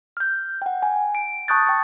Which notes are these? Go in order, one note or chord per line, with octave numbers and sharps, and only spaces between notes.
F6 G6
F#5 G5
G#5
D7
A5 C#6 D#6 F#6 G6 A6
G5 C#6